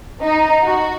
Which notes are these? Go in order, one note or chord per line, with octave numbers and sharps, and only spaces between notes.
D#4
F#4